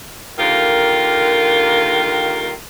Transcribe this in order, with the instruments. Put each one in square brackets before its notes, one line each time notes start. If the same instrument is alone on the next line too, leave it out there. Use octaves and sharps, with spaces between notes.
[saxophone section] D3 D#3 A#3 F4 G4 A#4